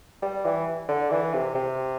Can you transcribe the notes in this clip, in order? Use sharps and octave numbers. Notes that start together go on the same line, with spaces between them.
G3
E3
D3
E3
C3
C3